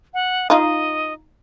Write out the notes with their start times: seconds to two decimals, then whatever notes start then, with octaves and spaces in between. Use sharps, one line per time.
0.14 F#5
0.50 D#4 F4 D#5